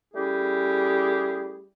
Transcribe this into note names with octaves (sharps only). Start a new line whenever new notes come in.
G3 A3 C#4 E4 G4 G#4